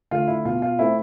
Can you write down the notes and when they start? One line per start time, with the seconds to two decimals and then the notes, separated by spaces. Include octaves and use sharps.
0.11 D3 A3 F4
0.27 E4
0.45 B2 F4
0.62 F4
0.79 A3 C4 E4